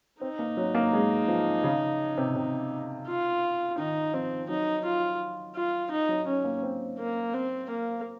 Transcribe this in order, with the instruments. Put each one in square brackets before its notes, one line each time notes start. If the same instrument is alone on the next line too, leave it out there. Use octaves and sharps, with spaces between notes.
[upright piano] C4 [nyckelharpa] D#4
[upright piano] A#3
F#3
A#3
G#3
F3
C#3
C3
C3
[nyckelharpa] F4
[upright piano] D#3 [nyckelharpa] D#4
[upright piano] F3 [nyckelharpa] C4
[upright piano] F#3 [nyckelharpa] D#4
[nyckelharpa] F4
F4
D#4
[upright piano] F#3
[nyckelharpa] C#4
[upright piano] A#3
C4
[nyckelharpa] A#3
C4
A#3